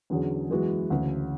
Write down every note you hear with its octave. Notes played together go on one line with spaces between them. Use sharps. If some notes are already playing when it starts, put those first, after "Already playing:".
E2 D3 F#3 C#4 G#4
F#2 E3 G#3 B3 F#4
D2 C#3 E3